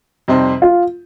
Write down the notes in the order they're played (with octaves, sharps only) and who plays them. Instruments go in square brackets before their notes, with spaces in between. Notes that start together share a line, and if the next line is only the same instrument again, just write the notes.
[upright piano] F2 C3 G3 C4 D#4
[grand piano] F4